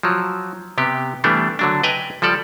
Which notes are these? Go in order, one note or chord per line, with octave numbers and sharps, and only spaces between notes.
F3 F#3
C3 B3 G4
E3 G3 A3 B3 D4
D3 F#3 D4
B4 D#5 G5 G#5 A#5
F3 G3 A4 D5